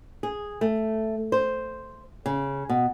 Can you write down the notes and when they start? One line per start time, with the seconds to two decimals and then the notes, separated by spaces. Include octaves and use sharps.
0.23 G#4
0.61 A3
1.32 C5
2.26 C#3
2.69 B2